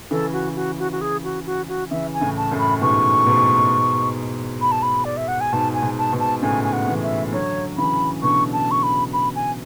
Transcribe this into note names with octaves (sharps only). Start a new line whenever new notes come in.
C#3 E3 A4
F#4
F#4
F#4
F#4
G#4
F#4
F#4
F#4
C#3 E3 E5
G#5
A2 C#3
A5
F#2 A2
B5
G#2 B2 C#6
G#2 B2
B5
A5
B5
D5
E5
F#5
G#5
G#2 B2 A5
G#5
G#2 B2
A5
G#2 B2
A5
A2 C#3 G#5
G#5
F#5
C#3 E3
E5
D3 F#3 C#5
C#3 E3 B5
B2 D3 C#6
A5
C#6
B5
B5
G#5